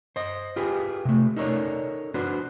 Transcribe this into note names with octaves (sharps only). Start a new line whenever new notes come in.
C5 D#5
F4 G4 G#4 B4
C3 A3
D#4 A4 A#4 C#5 D5
D4 F#4 B4 C5